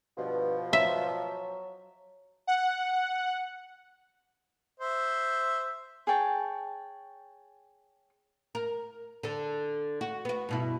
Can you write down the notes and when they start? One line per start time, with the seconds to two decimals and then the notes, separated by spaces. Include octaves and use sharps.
0.18 G2 B2 F3
0.73 F#3 E5
2.47 F#5
4.80 C5 E5
6.07 G#4 C#5 G5 A5
8.55 A#4
9.23 D3 A4
10.01 F#4
10.25 B3 F#4
10.49 G2 B2 E4